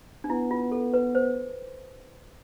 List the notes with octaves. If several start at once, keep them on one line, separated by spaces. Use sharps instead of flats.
D4
B3 E4
F4
A4
B4
C5